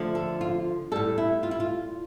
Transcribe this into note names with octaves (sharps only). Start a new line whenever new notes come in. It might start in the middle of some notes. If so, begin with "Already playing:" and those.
Already playing: D3 F3 A3
A4
F4
A2 G3 A4
E4
F4
E4
F4